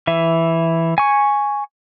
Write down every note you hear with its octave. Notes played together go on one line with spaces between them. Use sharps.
E3 E5
G#5 C#6